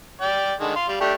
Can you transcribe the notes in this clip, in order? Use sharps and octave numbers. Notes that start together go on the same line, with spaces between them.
D5 G5
D3 D#3 G#3
F5 C6
G3 F5
A3 D4 G4